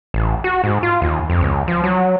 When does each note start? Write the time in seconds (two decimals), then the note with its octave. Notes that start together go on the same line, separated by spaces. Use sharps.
0.14 A1
0.44 F#4
0.64 G#2
0.83 F4
1.02 D#2
1.30 F2
1.41 C#2
1.68 F3
1.84 F#3